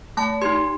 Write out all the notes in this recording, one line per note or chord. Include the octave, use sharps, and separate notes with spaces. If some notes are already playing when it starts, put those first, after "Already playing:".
A3 A5
D#4 G4 C6